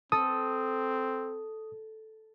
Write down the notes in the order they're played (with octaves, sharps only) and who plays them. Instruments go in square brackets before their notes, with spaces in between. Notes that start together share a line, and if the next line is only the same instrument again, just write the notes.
[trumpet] C4 [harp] A4 [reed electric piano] D#6